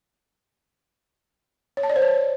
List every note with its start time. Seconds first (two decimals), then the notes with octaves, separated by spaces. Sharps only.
1.77 C#5
1.83 A5
1.90 D5
1.96 C5
2.02 C#5